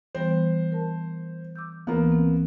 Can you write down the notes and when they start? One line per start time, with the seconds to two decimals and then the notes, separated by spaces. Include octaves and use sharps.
0.15 E3 G3 B3 C5
0.72 A#4 A5
1.56 D6 E6 G6
1.87 D2 E3 A#3 B3
2.12 C4